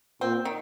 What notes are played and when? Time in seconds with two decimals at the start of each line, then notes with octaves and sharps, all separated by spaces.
0.21 A#2 C4
0.45 D#3